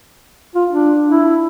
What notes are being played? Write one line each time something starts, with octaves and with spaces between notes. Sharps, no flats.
F4
D4
E4